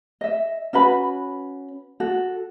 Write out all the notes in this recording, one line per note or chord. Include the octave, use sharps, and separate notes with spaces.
D#5 E5
C#4 F#4 B4 B5
F#4 A4